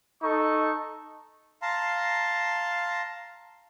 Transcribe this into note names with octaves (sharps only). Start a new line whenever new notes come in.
D#4 A4 C#6
F5 A5 A#5 C6